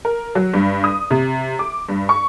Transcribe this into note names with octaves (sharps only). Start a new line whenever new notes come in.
A#4
F#3
G2
D#6
C3
D6
G2
C#6